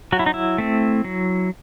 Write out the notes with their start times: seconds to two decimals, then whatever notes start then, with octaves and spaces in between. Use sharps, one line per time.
0.12 F#3 F#4
0.19 E4
0.26 D#4
0.34 E4
0.58 A3 C4
1.04 F#3